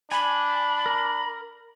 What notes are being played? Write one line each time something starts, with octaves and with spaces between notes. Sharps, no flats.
D4 G#5 B5
A#4